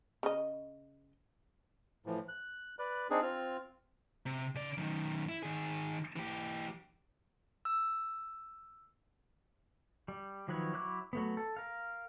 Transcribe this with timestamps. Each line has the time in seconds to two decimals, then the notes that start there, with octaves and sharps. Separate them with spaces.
0.23 C#3 D#5
2.06 A2 E3 F3
2.28 F#6
2.79 B4 D5 F#6
3.10 C4 D4 D#4 G#4
3.23 C4 F4 F6
4.26 C3
4.55 C#3 D5
4.78 F#2 D#3
5.29 E4
5.43 D#3 G#4
6.16 E3 G4
7.65 E6
10.08 G3
10.48 D#3 F3 F#3 B4 C#5
10.73 F#3 E4 C#6 D6 F#6
11.13 F#3 A3 B3
11.37 A4
11.57 A#4 F5